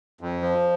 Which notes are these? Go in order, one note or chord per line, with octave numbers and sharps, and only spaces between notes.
F2
F3